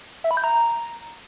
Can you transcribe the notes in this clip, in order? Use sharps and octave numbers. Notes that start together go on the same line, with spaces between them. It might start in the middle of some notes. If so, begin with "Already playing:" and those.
E5
B5
G6
A#5